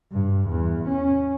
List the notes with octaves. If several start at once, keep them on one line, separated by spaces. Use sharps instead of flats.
G2
E2
C#4